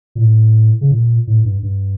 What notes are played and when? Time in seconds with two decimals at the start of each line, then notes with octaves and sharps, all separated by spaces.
0.15 A#2
0.21 A2
0.81 C#3
0.91 A#2
1.27 A2
1.45 G2
1.63 G2